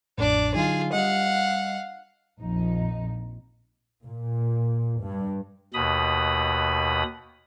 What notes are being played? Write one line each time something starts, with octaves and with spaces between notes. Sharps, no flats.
A1 F2 A2 D4 D5
D3 F#3 D#4 F4 G#4
G3 D#5 F5 F#5
A#1 F2 F3 D#4
A#2
G2
D#2 B2 B5 D#6